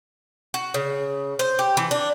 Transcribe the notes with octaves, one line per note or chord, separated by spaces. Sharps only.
F#4
C#3
C5
G4
E3
D4